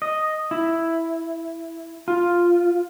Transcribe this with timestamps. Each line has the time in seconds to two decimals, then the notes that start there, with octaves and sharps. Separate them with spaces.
0.02 D#5
0.51 E4
2.08 F4